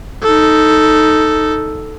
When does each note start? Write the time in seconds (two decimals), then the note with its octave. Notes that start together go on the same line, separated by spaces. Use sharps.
0.23 D#4 A4